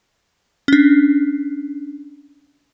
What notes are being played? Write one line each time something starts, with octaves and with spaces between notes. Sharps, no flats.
C#4 D4